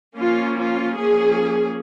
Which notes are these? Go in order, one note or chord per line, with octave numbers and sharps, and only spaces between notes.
F3 A#3 C#4 F4
F4
F3 A#3 C#4 G#4